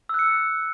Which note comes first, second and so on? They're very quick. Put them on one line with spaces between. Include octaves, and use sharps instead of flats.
E6 F#6 C#7